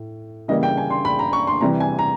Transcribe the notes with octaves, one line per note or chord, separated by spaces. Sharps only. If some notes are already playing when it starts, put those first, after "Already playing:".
Already playing: A2
C#3 E3 G3 A#3 D#5
G5
G#5
C6
B5
A#5
C#6
C6
C3 E3 G3 A#5
G#5
A#5